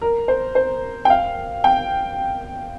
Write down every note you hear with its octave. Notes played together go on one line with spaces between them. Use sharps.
A#4
C5
C5
G5
F5
G5